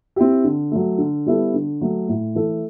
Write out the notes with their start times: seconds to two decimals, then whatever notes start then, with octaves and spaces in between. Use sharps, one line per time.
0.16 C4 E4 G4
0.44 D3
0.71 F#3 A3
0.98 D3
1.26 G3 B3 E4 A4
1.54 D3
1.81 F#3 A3
2.09 A2
2.35 E3 A3 E4 A4